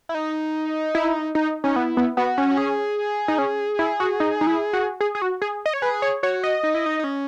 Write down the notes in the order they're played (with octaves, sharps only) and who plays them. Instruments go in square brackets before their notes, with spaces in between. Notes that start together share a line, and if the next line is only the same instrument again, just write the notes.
[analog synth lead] E4
D#4
[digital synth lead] E4
D#4
[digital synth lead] C#4 [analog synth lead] D#4
[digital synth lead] B3 [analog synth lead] E4
[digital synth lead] B3
[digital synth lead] B3 [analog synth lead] F#4
[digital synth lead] C#4
[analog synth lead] F#4
G#4
[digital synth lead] D#4
C#4
E4
F#4
D#4
D#4
E4
F#4
G#4
G#4
F#4
G#4
D#5
C#5
[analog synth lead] G#4 [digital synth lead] B4
[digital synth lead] C#5
[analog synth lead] F#4 [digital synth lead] C#5
[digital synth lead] D#5
[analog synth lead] D#4
E4
D#4
D#4
C#4